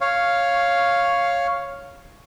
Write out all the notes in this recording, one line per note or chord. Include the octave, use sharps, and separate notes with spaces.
C#5 F5